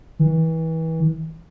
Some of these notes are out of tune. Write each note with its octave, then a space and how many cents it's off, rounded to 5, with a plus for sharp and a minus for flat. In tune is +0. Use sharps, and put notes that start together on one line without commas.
E3 -30